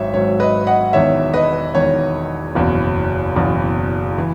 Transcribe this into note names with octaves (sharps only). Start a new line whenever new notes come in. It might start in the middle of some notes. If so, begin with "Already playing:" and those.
Already playing: G#1 G#2 F#3 C#5 E5
G#1 G#2 F#3 C#5
B4 D#5
D#5 F#5
E1 E2 D#3 C#5 E5
B4 D#5
E1 E2 D#3 C#5
F#1 E2 B2
F#1 E2 B2
E3